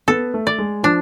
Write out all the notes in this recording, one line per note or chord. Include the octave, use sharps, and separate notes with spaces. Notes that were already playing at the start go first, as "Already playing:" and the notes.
B3 A4
A3
D5
G#3
F3 D4